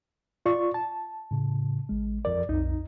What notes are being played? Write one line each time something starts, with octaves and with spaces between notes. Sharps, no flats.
F4 D5 C#6
A5
A2 C#3
A1 G#3
F2 A#4 D5
B1 F2 D#4